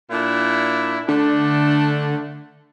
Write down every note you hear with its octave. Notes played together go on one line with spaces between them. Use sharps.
A#2 D4 E4
D3 A3 D4